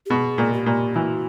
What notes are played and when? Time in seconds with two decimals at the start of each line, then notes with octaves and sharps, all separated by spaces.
0.06 G4
0.10 B2 G#4
0.38 A#2
0.53 G4
0.66 A#2
0.95 E3 F#4